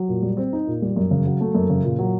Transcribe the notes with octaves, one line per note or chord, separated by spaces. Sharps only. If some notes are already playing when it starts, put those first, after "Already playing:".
Already playing: F#3
A#2
G3
C4
D#4
A#2
G3
F#2
C#3
F#3
A3
F#2
C#3
A#2
F#3